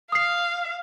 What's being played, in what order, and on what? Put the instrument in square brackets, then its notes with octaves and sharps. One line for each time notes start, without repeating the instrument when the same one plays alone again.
[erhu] F5 [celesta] D#6 C7